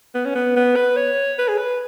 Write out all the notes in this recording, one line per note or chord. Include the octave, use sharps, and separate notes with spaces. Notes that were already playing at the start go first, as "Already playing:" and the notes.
B3
C#4
B3
B3
B4
C#5
B4
G#4
B4